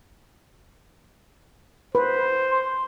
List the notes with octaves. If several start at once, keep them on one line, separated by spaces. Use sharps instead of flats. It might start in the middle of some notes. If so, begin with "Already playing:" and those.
B4 C5
C6